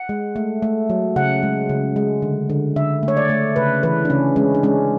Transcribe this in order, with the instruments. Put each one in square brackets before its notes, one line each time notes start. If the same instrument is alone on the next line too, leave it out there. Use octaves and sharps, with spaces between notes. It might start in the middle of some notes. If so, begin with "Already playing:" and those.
Already playing: [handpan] F#5
G#3
A3
A3
F#3
C#3 F#5
G#3
C#3
G#3
D3
D3
D3 E5
A3
C#5
D5
A3
C#3 B4
E3 B4
D4
C#3 C#4
G#3 C#4
D4
G#3 C#4